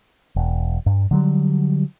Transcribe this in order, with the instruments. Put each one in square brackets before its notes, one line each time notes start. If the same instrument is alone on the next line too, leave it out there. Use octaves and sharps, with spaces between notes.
[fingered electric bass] E1
G2
D3 F#3 G3